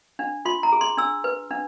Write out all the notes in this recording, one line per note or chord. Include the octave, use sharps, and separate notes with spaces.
D4
F4 C6
A#5
G#4
C6
D4 E6
B4
D4